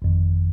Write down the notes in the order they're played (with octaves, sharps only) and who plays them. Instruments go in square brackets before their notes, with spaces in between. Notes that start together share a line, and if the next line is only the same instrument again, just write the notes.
[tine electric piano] G1 F2 D#3